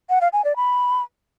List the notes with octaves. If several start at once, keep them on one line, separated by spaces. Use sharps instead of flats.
F#5
F5
G#5
D5
B5